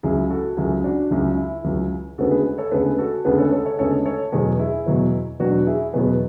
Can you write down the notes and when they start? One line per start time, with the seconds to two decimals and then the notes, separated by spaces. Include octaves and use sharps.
0.03 C#2 C#3 F#3 E4 G#4
0.30 F#4 A4
0.57 C#2 C#3 F#3 E4 G#4
0.84 D4 F#4
1.11 C#2 C#3 F#3 E4
1.37 E4
1.64 C#2 C#3 F#3
2.18 D2 C#3 G#3 B3 F#4 A4
2.31 G#4 B4
2.58 A4 C#5
2.72 D2 C#3 G#3 B3 G#4 B4
2.98 F#4 A4
3.25 D2 C#3 G#3 B3 G#4 B4
3.38 A4 C#5
3.52 A4 C#5
3.66 A4 C#5
3.79 D2 C#3 G#3 B3 A4 C#5
4.05 A4 C#5
4.32 E2 B2 F#3 B3 G#4 B4
4.59 E4 G#4
4.86 E2 B2 F#3 B3
5.40 E2 B2 F#3 B3 D4 F#4
5.67 E4 G#4
5.93 E2 B2 F#3 B3 G#4 B4